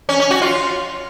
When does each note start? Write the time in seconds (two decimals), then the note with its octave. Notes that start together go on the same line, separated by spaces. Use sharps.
0.09 C#4
0.20 C#4
0.31 F#4
0.42 F4